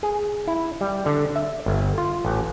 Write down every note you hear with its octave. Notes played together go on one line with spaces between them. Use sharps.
G#4
E4
G3
D3
E5
G1
F4
A1